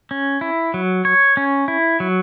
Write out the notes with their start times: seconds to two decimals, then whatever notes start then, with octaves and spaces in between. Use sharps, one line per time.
0.11 C#4
0.41 E4
0.74 F#3
1.05 C#5
1.37 C#4
1.68 E4
2.00 F#3